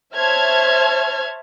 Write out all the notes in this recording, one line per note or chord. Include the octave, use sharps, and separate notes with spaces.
C5 C#5 E5 A5 F6 G#6